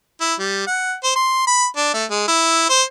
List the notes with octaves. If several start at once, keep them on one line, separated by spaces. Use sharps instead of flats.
E4
G3
F#5
C5
C6
B5
D4
A3
G#3
E4
C5